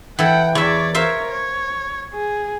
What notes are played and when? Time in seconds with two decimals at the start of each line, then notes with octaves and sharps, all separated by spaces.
0.19 E3 A4 F#5 G5
0.55 E2 C#5 D5 E5
0.95 A#4 C5 C#5 E5 F5
1.31 C#5
2.13 G#4